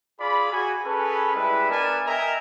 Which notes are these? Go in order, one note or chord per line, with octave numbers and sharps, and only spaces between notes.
F4 G#4 D5 B5
F#4 G#4 G#5
C#4 G#4 A4 B4
G3 G#3 E4 B4
B3 D4 A#4 B4 G#5 A5
A#4 D#5 E5 G5 G#5 A#5